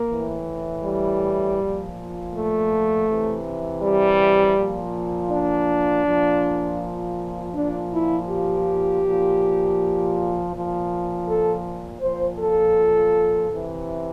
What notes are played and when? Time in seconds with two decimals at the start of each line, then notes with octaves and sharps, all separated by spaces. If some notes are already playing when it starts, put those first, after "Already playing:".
Already playing: A#3
0.09 A2 E3
0.83 G3
1.58 A#2 F3
2.33 A3
3.07 C3 E3
3.82 G3
4.56 A#2 F3
5.31 D4
6.05 A#2 F3
7.54 A#2 F3 D4
7.92 E4
8.29 G4
9.03 A#2 F3
10.52 A#2 F3
11.27 A4
12.01 A#2 F3 C5
12.39 A4
13.50 C3 E3